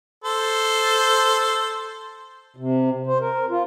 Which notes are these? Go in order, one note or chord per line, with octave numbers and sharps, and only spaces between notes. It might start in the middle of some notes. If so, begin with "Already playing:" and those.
A4 C5
C3
C5
A#4
F4